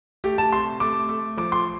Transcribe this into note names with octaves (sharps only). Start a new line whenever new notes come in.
A3 G4
A5
C3 C6
A3 D6
A3
F3 D6
C6